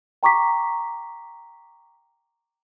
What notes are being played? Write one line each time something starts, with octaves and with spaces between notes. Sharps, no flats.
G5 A#5 C#6 D6 B6